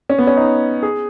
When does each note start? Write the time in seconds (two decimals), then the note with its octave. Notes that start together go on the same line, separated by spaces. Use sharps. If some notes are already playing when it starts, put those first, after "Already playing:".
0.09 C#4
0.18 B3
0.27 C#4
0.37 D#4
0.83 G#4